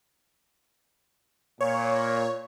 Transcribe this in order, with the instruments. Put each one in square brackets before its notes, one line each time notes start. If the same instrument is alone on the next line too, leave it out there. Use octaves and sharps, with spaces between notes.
[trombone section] A#2 [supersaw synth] C#5